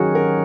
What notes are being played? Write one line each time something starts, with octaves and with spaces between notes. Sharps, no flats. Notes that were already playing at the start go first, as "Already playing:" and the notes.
Already playing: D#3 F#3 C#4 F#4 G#4
A#4